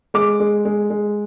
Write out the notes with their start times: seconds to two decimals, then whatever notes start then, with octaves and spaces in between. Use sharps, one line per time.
0.14 G#3 D6
0.40 G#3
0.65 G#3
0.90 G#3